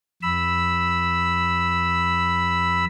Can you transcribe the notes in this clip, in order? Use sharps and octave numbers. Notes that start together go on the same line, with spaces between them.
F2 B5 E6